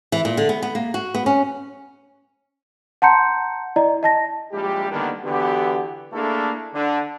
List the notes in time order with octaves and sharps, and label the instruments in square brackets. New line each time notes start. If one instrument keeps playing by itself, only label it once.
[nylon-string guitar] E3
A#2
D3
B3
B3
A#3
F#4
B3
C#4
[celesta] F#5 A5 A#5 C6 G6 C#7
E4 D5 D#5 A#5
D#5 A5 A#6
[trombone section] A#1 G3 G#3 E4 G4
D3 D#3 G3 A#3 B3 D4
D3 E3 B3 F#4 G4
A3 A#3 D4 E4 G#4 A4
D3